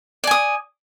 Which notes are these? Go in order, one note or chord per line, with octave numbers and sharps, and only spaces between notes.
D5 G#5 D#6